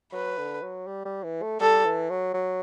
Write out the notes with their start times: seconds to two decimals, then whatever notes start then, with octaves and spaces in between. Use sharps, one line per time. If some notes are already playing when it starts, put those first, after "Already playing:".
0.12 F#3 B4
0.38 D3
0.62 F#3
0.87 G3
1.05 G3
1.24 E3
1.42 A3
1.60 G3 A4
1.85 E3
2.10 F#3
2.34 F#3